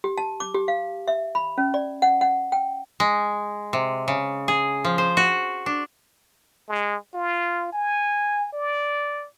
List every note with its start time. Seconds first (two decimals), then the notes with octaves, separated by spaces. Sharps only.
0.04 G4
0.18 A5
0.40 D6
0.54 G4
0.68 F5
1.08 E5
1.35 B5
1.58 C#4
1.74 D5
2.02 F#5
2.21 F#5
2.52 G5
3.00 G#3
3.73 C3
4.08 C#3
4.48 G#4
4.85 F3
4.98 C5
5.17 F#4
5.66 D4
6.68 G#3
7.14 F4
7.72 G#5
8.53 D5